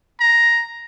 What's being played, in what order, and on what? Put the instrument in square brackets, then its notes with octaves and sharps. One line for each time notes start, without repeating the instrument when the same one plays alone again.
[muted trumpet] A#5